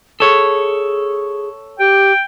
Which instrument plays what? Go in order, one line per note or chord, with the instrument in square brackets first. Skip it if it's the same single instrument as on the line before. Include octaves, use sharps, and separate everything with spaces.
[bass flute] G#4 [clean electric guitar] A4 C#5
[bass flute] G4 [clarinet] G5